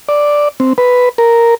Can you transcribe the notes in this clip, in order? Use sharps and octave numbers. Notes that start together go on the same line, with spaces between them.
D5
C4
B4
A#4